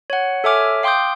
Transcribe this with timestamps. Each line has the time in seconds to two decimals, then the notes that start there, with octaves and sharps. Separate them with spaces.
0.10 C#5 F#5
0.44 A4 C#5 E5 G#5 D6 F6
0.83 F5 G5 C6 D6 D#6 G6